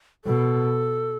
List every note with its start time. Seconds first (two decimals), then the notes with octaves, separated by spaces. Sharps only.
0.25 B2 A4